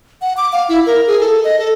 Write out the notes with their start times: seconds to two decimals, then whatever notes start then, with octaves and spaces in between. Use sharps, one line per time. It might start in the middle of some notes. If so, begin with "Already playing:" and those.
0.22 F#5
0.37 D6
0.52 F5
0.69 E4
0.86 A#4
1.07 G#4
1.20 A4
1.44 D#5
1.59 A4